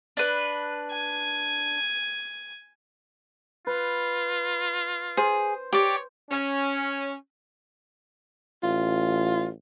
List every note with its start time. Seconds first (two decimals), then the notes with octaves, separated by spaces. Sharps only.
0.17 D4 B4
0.92 G#5
3.67 F4 B4
5.17 G#4 C5
5.73 G4 C#5 D5
6.30 C#4
8.63 A1 F4